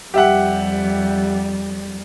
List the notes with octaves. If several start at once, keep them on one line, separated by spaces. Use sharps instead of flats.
F2 G3 G4 E5 F#5